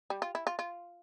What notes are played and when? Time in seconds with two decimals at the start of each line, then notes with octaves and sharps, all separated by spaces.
0.10 G3
0.22 F4
0.35 E4
0.47 F4
0.59 F4